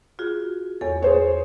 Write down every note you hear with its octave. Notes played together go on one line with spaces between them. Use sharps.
F4 F#4 G#4
E2 A4 C#5
G#4 C5 C#5